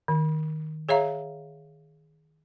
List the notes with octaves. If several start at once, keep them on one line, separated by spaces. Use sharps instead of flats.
D#3
G#4 C#5 E5 F5 A#5